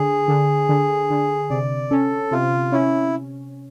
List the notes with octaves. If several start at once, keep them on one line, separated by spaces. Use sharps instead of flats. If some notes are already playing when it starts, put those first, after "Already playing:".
Already playing: D3 G#4
D3
D3
D3
C3 D5
C#4 A4
C3 F4
C#4 E4